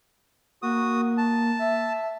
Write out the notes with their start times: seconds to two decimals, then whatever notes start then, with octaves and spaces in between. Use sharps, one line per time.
0.62 A#3 F#4 D#6
1.17 A5
1.59 E5